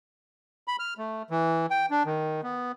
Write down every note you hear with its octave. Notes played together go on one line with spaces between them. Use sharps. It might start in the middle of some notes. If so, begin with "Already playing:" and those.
B5
F6
A3
E3
G5
D4
D#3
B3